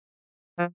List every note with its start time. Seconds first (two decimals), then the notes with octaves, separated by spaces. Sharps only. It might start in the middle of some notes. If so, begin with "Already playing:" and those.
0.59 F3